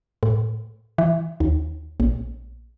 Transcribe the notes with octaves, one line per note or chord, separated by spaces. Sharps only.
A2
E3
D#2
A#1